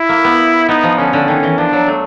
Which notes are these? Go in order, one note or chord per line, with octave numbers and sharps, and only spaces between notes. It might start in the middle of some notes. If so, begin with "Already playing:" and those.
Already playing: E4
A#3
B3
B3 D#4
F3
D3 C#4
D3
D#3 C#4
E3
F3 D4
F#3
A3